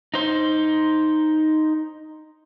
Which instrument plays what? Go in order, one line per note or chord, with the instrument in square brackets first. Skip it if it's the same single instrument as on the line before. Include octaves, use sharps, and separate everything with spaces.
[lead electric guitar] D#4 C5